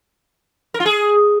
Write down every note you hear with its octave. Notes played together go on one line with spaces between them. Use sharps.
A#4
F4
G#4